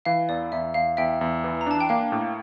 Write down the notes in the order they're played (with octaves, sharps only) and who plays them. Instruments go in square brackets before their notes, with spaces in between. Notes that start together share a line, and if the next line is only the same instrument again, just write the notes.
[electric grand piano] E3 [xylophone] F5
[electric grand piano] E2 [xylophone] D5
[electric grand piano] E2 [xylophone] E5
[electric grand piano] E2 [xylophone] F5
[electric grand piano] E2 [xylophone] E5 G5
[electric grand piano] E2
E3
[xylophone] A#5
[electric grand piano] D4 [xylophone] A5
[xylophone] G5
[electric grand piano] A#3 [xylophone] F5
[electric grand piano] A2